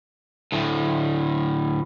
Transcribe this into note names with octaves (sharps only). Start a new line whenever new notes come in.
D2 A2